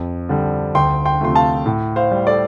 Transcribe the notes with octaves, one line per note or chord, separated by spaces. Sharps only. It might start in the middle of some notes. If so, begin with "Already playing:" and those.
Already playing: F2
D3 G3
D2 G5 C6
G5 C6
C3 F3 A3 C6
F5 A5
A2
C5 F5
G3
A4 D5